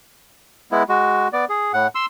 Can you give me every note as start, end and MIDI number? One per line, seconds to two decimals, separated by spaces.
0.72 0.83 56
0.72 0.83 59
0.72 0.83 64
0.89 1.28 56
0.89 1.28 66
1.33 1.45 59
1.33 1.45 74
1.49 1.72 68
1.74 1.87 45
1.74 1.87 78
1.95 2.06 84
1.95 2.06 88